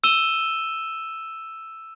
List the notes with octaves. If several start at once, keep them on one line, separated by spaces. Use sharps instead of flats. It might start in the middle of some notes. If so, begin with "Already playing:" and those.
E6 D#7 E7 G7